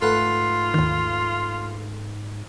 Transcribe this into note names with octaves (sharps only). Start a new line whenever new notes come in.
G#2 A3 F4 B4 F#5
D#2 D#3